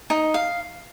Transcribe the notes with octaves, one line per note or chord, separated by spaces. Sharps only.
D#4
F5